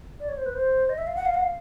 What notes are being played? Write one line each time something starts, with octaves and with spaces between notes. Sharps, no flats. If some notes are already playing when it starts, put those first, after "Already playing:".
D5
C#5
C5
B4
C5
D#5
E5
F5
F#5
F5
F#5
F5